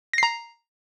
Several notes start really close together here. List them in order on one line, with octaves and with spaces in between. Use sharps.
A#6 C7 A#5